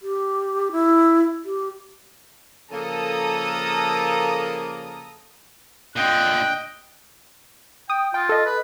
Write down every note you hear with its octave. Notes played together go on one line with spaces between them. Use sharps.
G4
E4
G4
C#3 F3 A#3 A4 A#5 D#6
A#2 D3 D#5 G5 F#6
G5 D#6
F4 G5
A4 D#5
B4